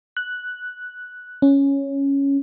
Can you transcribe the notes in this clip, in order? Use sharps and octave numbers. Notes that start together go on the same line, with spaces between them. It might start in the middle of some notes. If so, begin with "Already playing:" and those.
F#6
C#4